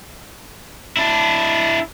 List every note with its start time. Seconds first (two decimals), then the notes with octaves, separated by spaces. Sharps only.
0.97 D4 E4